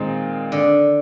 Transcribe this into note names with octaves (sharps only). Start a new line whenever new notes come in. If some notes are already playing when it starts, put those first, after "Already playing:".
Already playing: A#2 D#3 G#3 C4 D#4
D3